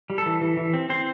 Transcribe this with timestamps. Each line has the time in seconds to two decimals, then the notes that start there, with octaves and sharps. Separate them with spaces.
0.10 G3
0.18 A4
0.26 E3
0.41 E3
0.57 E3
0.74 C4
0.90 C4 C5